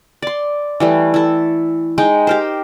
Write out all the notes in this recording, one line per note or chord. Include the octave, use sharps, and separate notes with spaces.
D5 C6
E3 G3 A3
E4 A4
G#3 D#4 G5
G4 A#4 C5